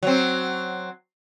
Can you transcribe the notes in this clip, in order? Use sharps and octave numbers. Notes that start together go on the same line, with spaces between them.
F#3 C4